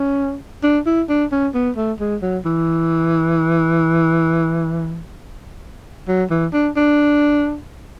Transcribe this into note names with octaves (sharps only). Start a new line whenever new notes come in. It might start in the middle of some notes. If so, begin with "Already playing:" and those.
Already playing: C#4
D4
E4
D4
C#4
B3
A3
G#3
F#3
E3
F#3
E3
D4
D4